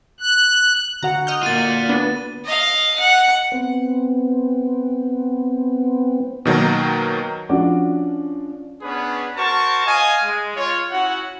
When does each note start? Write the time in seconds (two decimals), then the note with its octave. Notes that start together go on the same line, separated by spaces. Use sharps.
0.20 F#6
1.03 D3 F#4 F#5 A#5
1.27 D#5 F6 G6
1.43 A#3 F4 A6 D#7
1.89 B3 D4
2.45 D#5 F5
2.99 F#5
3.52 B3 C4
6.45 B2 D#3 F#3 A#3
7.49 F3 C#4 D4 F#4 D6
8.82 B3 C#4 D4 G#4 B4
9.37 F#4 A#4 C5 A5 C#6
9.86 D#5 F5 G#5
10.23 G#3
10.56 F4 C#5
10.91 C#4 E4 F#4 F#5